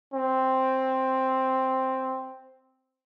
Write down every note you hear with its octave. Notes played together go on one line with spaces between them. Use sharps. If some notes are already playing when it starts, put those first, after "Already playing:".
C4